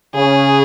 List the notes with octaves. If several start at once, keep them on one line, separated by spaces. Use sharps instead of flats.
C#3 G#4